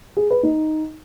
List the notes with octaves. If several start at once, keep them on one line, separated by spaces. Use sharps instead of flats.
G#4
B4
D#4